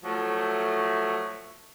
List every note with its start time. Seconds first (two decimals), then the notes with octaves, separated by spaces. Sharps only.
0.03 F3 F#3 A3